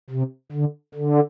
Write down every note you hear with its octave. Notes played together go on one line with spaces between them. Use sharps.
C3
D3
D3